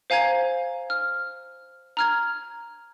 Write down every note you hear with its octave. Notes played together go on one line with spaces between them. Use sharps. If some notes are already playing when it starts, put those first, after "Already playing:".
C5 F5 G#5 A#5 G#6
F6
A#5 F6 G#6